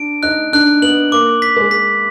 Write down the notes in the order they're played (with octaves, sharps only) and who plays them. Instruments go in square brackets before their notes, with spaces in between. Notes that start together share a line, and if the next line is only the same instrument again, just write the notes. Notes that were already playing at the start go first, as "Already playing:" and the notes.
Already playing: [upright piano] D4 [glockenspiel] D7
[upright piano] D#4 [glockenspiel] F#6
[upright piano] D4 [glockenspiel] F#6
[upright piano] B3 [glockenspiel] F#7
[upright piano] A#3 [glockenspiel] D6
[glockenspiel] B6
[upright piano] G#3
[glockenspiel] B6